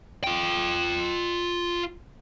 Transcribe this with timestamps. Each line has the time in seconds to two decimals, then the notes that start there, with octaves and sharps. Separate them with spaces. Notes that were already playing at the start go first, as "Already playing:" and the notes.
0.24 F4 G5